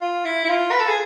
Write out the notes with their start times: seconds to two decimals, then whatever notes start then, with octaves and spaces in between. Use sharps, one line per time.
0.01 F4
0.24 E4
0.45 E4
0.49 F4
0.72 B4
0.80 A4
0.88 G#4